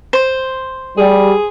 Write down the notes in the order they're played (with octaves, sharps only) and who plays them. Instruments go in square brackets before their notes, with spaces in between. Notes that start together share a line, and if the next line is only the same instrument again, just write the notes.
[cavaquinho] C5
[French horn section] G3 [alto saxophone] G#4